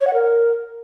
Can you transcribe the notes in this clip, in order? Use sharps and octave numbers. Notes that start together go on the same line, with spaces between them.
C#5
F#5
A#4